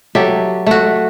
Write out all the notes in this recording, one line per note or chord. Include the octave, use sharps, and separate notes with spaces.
F#3 G4 A4 E5
A3 F#4